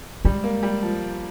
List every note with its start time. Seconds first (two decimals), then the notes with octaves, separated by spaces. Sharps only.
0.25 G3 G#3
0.44 A#3
0.63 G3
0.83 F3